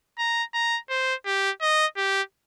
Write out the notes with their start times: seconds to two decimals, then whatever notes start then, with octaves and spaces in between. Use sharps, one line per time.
0.19 A#5
0.54 A#5
0.90 C5
1.26 G4
1.61 D#5
1.97 G4